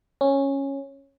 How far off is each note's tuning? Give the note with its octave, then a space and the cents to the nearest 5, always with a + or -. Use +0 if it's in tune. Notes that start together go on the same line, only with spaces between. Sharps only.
C#4 -10